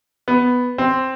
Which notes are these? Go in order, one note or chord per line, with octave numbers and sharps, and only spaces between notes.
B3
C4